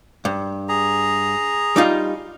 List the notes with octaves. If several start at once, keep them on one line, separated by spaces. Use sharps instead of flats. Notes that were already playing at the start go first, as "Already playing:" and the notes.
G2
G#4 A#5
G3 D#4 F4